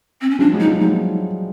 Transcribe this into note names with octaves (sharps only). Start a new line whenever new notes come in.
C4
C#4
F3 G3 D4
F#3 G#3
D#4
F3 G3
F#3 G#3 D#4